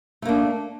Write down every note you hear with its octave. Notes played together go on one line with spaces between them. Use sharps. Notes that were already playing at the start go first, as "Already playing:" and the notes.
A3 A#3 D4